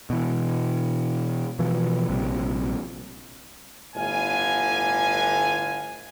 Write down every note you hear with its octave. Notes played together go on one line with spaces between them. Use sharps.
B2 E3
B2 E3 F3
A#1 C3 G3
G1 A2 D3 B3 F5 G#5